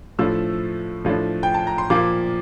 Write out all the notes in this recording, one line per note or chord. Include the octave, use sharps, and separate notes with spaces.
A2 F3 A3 D4 E6
A2 F3 A3 D4
G5
A5
A#5
C6
A#2 F3 A#3 D6